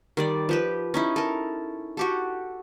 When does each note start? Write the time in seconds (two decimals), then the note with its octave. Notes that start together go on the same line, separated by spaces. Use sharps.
0.17 D#3 G3 D5
0.49 F3 G4 B4
0.94 C#4 D#4 E4
1.16 A4 A#4
1.97 F#4 G4 A4